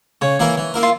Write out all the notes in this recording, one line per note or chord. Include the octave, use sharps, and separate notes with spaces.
C#3 C#5
E3 A#3 E4 A#4
E3
A#3 E4 A#4
F4